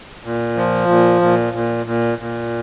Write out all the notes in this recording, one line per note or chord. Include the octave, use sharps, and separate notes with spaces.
A#2
F3
A#2
A#2
A#2
A#2
A#2